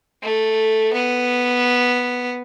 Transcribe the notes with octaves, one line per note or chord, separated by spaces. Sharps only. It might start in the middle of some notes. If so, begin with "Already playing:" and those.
A3
B3